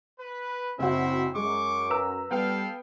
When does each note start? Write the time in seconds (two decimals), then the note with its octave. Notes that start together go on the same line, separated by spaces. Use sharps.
0.19 B4
0.79 F#1 F#2 C4 E4 F#4 C5 E5
1.35 F#2 G#3 C#6 D6
1.90 B4 A#5 E6
2.31 G3 B3 A4 F5 G5